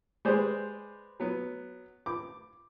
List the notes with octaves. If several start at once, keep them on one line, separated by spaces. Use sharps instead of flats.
G#3 G4 G#4 B4 C5 D5
F#3 B3
D6